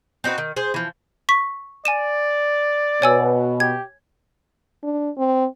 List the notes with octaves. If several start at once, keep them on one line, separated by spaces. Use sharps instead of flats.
C4 D#4 F#4 B4
D#3
G#4 C5
E3 F3
C#6 B6
D5 G#5 D#7 E7
B2 C#5 G#5 E6
G4 G#6
D4
C4